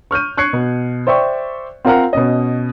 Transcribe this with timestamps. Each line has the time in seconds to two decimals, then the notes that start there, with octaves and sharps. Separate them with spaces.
0.11 C#6 F6 G6 D#7
0.37 C#6 F#6 G#6 C7 C#7
0.53 B2
1.07 C5 D5 E5 G5 C#6
1.85 C4 F4 A#4 F5 F#5 A#5
2.13 B2 C#4 D#5